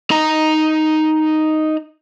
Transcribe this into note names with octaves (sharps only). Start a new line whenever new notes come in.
D#4 A#5